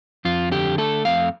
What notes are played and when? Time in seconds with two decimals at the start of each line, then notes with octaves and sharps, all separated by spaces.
0.25 F2 F4
0.52 D3 G4
0.78 A3 A4
1.05 F2 F5